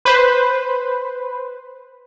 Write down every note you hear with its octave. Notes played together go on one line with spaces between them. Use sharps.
B4 C5